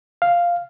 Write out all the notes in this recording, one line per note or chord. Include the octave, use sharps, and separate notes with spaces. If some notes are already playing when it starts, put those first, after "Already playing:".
F5